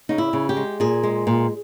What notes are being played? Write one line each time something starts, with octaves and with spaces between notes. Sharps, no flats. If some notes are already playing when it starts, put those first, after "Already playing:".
C#3 D#4
E4
C#3
G4
G#3
A#2 G#4
G#3
A#2